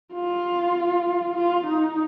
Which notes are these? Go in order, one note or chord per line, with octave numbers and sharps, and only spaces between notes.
F4
F4
D#4